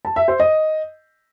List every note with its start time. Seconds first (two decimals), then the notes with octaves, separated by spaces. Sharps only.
0.05 A5
0.16 E5
0.28 C5
0.40 D#5